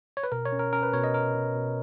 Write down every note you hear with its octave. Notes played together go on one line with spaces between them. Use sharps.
C#5
B4
B2 A#4
C#5
C#4
A#4
C#4 A#4
B4
B2 C#5
D#5
B2 A#4
B2
B2